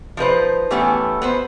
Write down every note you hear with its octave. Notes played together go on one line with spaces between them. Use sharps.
F3 D#4 B4 C5
E3 A3 B3 C#4 G4 A4
B3 B4 C5